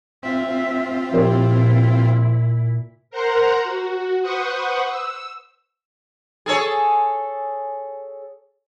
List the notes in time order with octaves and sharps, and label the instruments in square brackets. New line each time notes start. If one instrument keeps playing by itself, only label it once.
[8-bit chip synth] C4 F4 [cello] E5
[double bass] A#2 [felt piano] F3 G4 C5 [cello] E4
[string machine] A#4 C5 F#5 A#5 C6
F#4
B4 C5 F#5 C#6 D#6
E6
[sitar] G#4 A4 C#5